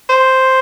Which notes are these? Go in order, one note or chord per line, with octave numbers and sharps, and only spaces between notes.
C5